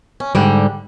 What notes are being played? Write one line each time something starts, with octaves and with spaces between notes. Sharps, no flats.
C#4
G#2 D3 G3